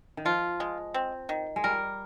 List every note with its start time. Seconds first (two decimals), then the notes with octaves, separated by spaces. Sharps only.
0.17 D#3
0.25 F3 F4
0.60 G#3
0.94 C4
1.29 D#3
1.56 G#3
1.64 G3 A#4